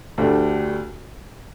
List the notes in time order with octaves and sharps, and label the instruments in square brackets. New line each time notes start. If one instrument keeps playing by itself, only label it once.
[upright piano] D2 D3 A3 D4 G4